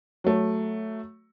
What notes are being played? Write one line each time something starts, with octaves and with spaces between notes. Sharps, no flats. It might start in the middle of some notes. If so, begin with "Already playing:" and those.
F#3 A3